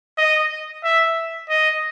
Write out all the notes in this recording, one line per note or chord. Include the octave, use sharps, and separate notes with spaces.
D#5
E5
D#5